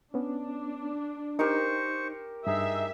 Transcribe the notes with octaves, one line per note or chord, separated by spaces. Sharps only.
B3 C#4 D4
D#4 G4 A#4 C5 C#6
G2 D#4 G#4 E5